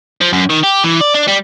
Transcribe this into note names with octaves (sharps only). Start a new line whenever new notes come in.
F3
F#2
D#3
G4
E3
D5
D4
G3